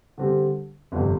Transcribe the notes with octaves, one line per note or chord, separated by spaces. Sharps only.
D3 G3 C4
G1 F2 C3